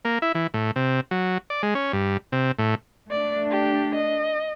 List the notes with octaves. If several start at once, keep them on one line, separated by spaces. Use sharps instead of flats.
A#3
E4
E3
A2
C3
F#3
D5
G#3
C#4
G2
C3
A2
A3 D4 D5
G4
D#5